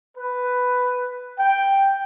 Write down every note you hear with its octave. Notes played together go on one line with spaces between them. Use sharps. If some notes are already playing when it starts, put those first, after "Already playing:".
B4
G5